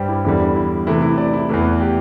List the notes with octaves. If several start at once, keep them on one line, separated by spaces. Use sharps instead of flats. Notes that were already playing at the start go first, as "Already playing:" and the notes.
Already playing: G2 G3 G4 C5
E4
E2 D3 G3 E4
E4
C3 E3 A3 E4
E4
D5
E4
E2 E3 A3 E4
G4